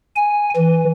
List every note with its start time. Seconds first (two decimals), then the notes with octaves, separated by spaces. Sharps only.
0.16 G#5
0.56 E3